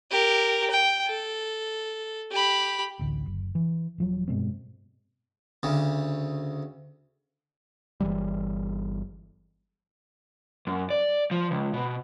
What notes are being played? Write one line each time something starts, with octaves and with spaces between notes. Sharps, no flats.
G4 A#4
G5
A4
G4 B5
A1 D2
F#1
E3
D#1 F3 F#3
G2 B2 G#3 C4
D2 C#3
G1 C2 E3 G3
F#2
D5
F3
C#2
B2